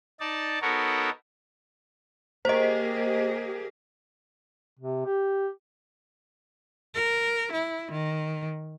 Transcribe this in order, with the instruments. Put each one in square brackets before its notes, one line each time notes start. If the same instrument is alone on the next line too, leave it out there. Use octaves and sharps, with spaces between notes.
[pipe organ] D#4 D5 A5
B3 D#4 F#4 A4 A#4 C#5
[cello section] A#3 G4 G#4 [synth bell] C5 D#5
[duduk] C3
G4
[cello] A#4
E4
D#3